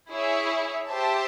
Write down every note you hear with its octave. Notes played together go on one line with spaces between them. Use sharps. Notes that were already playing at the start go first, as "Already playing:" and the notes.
E4 G#4 C#5 E5
G4 C5 E5 A5